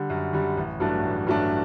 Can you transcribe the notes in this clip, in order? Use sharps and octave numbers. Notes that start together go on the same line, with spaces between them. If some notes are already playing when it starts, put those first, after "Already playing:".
Already playing: D3 G3
F#2
D3 G3
A1
G2 F#3 A3 D4
A1
G2 F#3 A3 D4